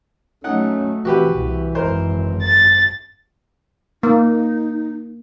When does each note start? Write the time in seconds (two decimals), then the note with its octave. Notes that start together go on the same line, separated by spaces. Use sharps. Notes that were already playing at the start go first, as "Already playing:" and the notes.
0.44 F#3 A3 C#4 D#4 F#5
1.05 C3 E3 F#4 G4 B4
1.35 C2 E3
1.75 G#1 F#2 A#4 C5
2.44 A6
4.03 A#3 D#4